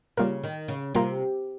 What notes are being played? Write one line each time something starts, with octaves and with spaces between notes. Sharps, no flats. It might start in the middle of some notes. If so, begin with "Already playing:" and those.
C#3 G3 A#3 F4 A#4
D#3
C#3
C3 G3 A#3 F4 A#4